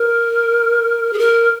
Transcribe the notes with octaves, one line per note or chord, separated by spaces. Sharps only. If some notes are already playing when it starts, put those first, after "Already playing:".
Already playing: A#4
G#4
A#4